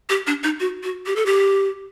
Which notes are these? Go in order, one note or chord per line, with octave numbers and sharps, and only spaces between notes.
G4
D4
D#4
F#4
F#4
G4
A4
G4